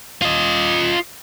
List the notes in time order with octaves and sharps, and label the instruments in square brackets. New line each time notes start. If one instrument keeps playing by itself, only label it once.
[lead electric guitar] F4 D#5